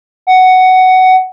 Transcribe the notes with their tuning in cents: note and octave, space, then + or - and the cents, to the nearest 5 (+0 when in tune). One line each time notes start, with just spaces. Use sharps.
F#5 +10